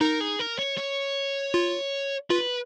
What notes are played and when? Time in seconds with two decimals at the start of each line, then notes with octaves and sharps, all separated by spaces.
0.01 D#4 A#4
0.20 G#4
0.39 A#4
0.59 C#5
0.77 C#5
1.54 F4
2.30 F4 B4